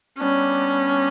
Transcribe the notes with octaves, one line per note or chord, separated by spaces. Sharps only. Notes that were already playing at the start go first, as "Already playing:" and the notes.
G3 B3 C#4 D4